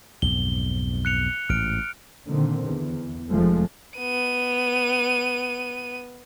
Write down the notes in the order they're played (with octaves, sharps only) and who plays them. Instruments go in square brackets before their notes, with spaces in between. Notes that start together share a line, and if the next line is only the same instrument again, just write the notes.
[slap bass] B1 F2 G#2 [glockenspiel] G7
[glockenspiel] F#6 C#7 F7
[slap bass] A1 G#2 [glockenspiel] F6 D7
[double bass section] A#2 D3 D#3 C4
E2
F1 F3 G#3 A3
[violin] B3 D#7